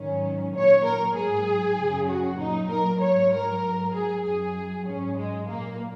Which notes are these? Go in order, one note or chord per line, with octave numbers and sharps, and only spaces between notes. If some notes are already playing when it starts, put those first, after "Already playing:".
Already playing: G#2 D#3 F#3 C#4
A#2 F#3 C#5
A#4
G#2 F#3 G#4
F#2 C#3 F#3
F#4
A#2 F#3 D#4
A#4
G#2 F#3 C#5
A#4
G#2 F#3
G#4
F#2 F#3 G#4
G#2 F#3 C#4
G#3
A#2 F#3 A#3